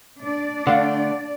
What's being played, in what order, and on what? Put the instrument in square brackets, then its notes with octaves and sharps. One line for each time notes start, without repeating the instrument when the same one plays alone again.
[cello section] D4 D5
[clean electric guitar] D3 A3 [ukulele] F5 F#5